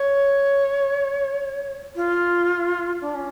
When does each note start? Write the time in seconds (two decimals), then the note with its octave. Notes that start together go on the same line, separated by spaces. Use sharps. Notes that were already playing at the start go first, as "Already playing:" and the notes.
Already playing: C#5
1.96 F4
3.01 D4
3.14 C#4